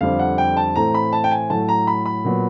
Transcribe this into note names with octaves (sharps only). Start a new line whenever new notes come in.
F2 D3 G3 C4 F5
F#5
G5
A5
A2 E3 A3 C4 A#5
B5
A5
G5
G#5
A2 F#3 A3 A5
A#5
B5
B5
A#2 F#3 B3